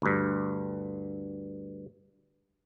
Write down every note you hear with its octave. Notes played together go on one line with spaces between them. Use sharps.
D2 G2